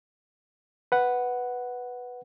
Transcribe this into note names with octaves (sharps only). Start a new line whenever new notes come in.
B4 F#5